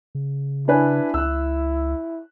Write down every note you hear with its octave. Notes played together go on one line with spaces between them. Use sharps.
C#3
D4 E4 B4 G#5
C#2 E6 F#6